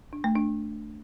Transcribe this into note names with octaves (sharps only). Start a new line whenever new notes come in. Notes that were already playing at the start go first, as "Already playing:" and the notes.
D4
A3
D4